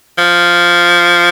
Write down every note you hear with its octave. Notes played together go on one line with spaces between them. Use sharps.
F3